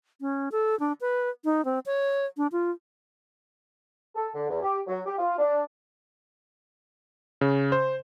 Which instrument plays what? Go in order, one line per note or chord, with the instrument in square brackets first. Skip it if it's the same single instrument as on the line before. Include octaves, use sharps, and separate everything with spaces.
[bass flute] C#4
A4
D4
B4
D#4
C4
C#5
D4
F4
[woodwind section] A4
D3
E2
G4
F#3
G4
F4
D4
[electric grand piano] C#3
C5